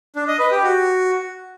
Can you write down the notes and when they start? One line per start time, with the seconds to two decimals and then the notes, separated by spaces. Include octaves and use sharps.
0.16 D4
0.28 D#5
0.39 B4
0.51 G4
0.63 F#4